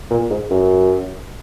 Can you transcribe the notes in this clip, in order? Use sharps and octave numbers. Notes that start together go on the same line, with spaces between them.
A#2
G#2
F#2